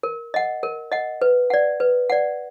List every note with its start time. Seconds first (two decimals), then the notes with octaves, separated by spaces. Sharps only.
0.03 A#4
0.34 D#5 F#5
0.63 A#4
0.92 D#5 F#5
1.22 B4
1.50 D5 F#5
1.80 B4
2.10 D5 F#5